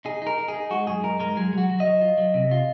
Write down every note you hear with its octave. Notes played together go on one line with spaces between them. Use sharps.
D#4 G#4
D#4 A#4
D#4
G#4
D#4
G#3 F#4
F#2 G#4
D#4 A#4
G#3 A#4
F#3 G#4
F#3 F#4
F#3
D#5
F#3
F4
F#3
C3
F4